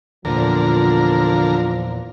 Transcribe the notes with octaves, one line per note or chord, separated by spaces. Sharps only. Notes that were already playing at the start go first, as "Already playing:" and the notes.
E2 A#2 D3 F3 A#4